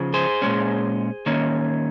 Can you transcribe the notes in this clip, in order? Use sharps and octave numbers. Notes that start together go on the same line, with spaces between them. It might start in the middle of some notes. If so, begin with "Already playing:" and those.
Already playing: C#3 F3
G#4 C5
A#2 G#3 C#4
D#3 A#3 C#4